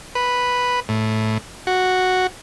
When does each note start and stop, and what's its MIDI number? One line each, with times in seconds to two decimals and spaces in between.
0.15 0.80 71
0.89 1.38 45
1.67 2.27 66